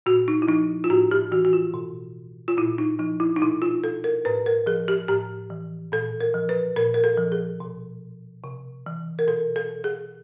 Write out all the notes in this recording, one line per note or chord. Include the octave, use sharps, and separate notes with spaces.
A#2 F#4
D#4
E4
F3 D#4
F4
A2 F#4
G4
E3 F#4
F#4
F4
B2
F4
A#2 E4
D#4
F3 D#4
E4
D#4
B2 E4
F4
A4
A#4
A2 B4
A#4
F3 G#4
G4
A2 G4
E3
A#2 A4
A#4
F3
B4
A#2 A#4
A#4
A4
F3
G#4
B2
C3
E3
A#4
B2 A4
A4
G#4